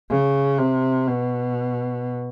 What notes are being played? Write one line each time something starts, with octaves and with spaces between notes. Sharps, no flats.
C#3
C3
B2